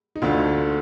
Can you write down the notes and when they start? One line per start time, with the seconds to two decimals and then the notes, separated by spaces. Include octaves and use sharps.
0.16 D#4
0.22 D2 D3 A3 F4